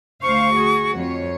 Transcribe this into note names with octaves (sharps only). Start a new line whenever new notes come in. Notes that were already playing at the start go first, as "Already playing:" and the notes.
D2 C5 F5 C#6
F#4 G#4
F2 C#5